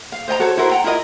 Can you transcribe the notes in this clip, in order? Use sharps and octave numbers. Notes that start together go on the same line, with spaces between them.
F5
C5 D#5 G5 A#5
F#4 A4 C5 C#5
E4 F#4 A#4 C5
F#5 G5 A#5
E4 F4 A#4 D#5